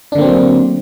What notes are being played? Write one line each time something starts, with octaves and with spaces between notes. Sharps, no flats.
D3 F#3 A#3 C4 D4